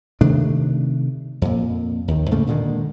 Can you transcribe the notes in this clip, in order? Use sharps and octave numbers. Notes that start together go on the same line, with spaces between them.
C3 D#3 A3 D4
F2 A#2
D#2 D#3
G#2 C#3 A3 A#3
A#2 D3 D#3 G#3